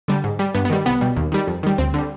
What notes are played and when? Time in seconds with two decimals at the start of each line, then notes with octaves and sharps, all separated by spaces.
0.08 D3 G3
0.24 G#2
0.39 G3
0.55 G2 B3
0.65 B3
0.70 D#3 G3
0.86 C2 B3
1.01 B2 G3
1.17 D#2
1.32 D#3 G3
1.47 F2
1.63 D#3 G3
1.78 D2 C4
1.94 D3 G3